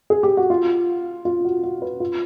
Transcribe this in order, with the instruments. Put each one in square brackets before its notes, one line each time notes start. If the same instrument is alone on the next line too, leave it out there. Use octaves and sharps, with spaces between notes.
[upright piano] G#4
G4
F#4
F4
F4
F#4
F#4
B4
F4